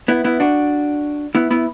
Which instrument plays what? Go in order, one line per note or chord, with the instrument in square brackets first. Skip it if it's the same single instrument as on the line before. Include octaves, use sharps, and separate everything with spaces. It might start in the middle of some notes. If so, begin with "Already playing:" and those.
[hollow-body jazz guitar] B3 E4
B3 E4
D4 F#4
B3 E4
B3 E4